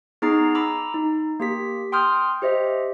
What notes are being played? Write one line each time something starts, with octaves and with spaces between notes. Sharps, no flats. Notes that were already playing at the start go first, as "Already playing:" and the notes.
B3 D#4 G#4 A#5 A6 C7
A#5 B5 D6 E6
D#4
A#3 G4 B6
G5 C6 D#6 F6 G6
G4 C5 D#5 E5